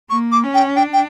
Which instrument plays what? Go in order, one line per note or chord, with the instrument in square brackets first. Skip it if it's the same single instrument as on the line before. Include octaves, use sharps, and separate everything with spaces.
[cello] A#3 [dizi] C#6
[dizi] D6
[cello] C#4
[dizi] G5
[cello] D4 [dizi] G5
[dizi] G5